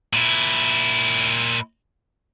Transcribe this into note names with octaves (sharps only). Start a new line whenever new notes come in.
A#2 E4